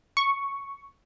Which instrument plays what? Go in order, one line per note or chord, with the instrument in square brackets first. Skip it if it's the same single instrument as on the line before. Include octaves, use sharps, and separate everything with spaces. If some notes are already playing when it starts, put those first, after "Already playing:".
[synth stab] C#6